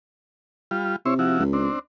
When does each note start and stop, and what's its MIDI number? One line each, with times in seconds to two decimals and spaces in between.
0.71 0.96 55
0.71 0.96 65
1.05 1.37 48
1.05 1.14 64
1.05 1.14 72
1.05 1.14 73
1.19 1.44 53
1.19 1.44 64
1.19 1.44 66
1.39 1.69 37
1.53 1.79 60
1.53 1.79 62